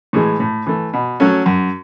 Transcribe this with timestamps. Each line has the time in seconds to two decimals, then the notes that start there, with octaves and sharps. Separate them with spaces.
0.13 A2 E3 G#3
0.40 A2
0.66 E3 A3
0.93 B2
1.20 F#3 A3 C#4
1.46 F#2